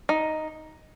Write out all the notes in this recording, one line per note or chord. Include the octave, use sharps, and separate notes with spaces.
D#4